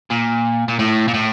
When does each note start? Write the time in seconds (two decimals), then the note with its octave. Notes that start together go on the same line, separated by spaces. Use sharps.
0.11 A#2
0.68 A#2
0.79 A2
1.08 A#2
1.14 A2